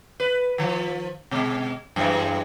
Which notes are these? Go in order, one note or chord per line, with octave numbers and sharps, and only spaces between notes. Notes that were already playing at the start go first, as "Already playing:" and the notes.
B4
D#3 F3
B2 G#3
F#2 E3 G#3